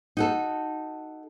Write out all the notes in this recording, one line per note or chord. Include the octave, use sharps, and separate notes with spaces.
D#4 F#4 A4